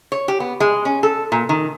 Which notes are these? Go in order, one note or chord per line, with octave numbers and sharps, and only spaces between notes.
C#5
G4
B3
G#3
C#4
A4
A#2
D#3